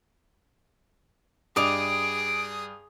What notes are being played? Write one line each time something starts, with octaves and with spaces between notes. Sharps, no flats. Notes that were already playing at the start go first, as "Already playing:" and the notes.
G2 G#4 D5 D#5 D6 D#6 D7 F7